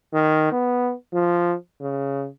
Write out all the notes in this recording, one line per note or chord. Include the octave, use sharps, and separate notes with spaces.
D#3
B3
F3
C#3